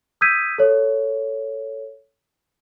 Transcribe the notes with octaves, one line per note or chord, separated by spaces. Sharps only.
D#6 E6 G6 G#6 B6 D#7
A4 C#5